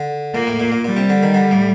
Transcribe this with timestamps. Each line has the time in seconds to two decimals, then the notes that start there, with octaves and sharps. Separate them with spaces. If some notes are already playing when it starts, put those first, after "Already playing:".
Already playing: D3
0.35 A#2 A#3
0.47 A2
0.60 A#2
0.72 A#2
0.85 A#2 G3
0.97 C3
1.10 D3
1.23 D#3
1.34 D3
1.51 A2